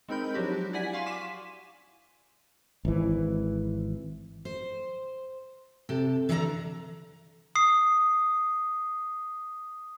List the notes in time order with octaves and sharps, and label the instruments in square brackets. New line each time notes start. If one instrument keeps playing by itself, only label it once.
[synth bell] G#3 C4 D#4 A#4 B5 G6
F3 F#3 D4 F#4 G4
E4 D5 F#5 G#5 B6
F5 G#5 C6 C#6
D6 B6 D#7 E7
[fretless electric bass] G#1 E3
[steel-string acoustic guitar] C5
C3 G4 A4
D3 E3 A4 D5 D#5 A#5
[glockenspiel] D#6 C7